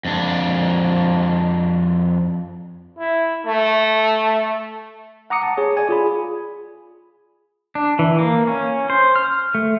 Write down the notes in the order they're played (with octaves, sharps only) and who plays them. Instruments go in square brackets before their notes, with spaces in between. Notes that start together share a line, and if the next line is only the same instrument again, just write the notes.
[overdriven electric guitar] F2 D4
[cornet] E4
A3
[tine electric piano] F#5 A#5 D6 D#6 C#7
A5
G#4 C#5
D5 G#5
F4 G#4 B5
[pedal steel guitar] D4
E3
A#3
C#4
C5
F6
A3